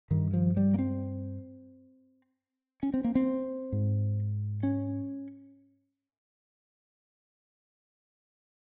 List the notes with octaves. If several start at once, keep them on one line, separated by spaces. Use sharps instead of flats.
G2 D#3
F3
G3
A#3
C4
C#4
C4
A#3
C4
G#2
C#4